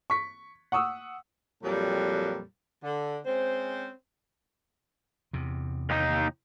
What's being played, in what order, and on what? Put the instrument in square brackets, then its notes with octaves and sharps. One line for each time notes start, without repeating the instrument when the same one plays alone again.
[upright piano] C#6 B6
F#5 C#6 D#6 E6
[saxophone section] F2 A#2 F#3 G3
D3
G#3 C4 C#4 C5
[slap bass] E2 C3
[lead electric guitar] D#2 D#4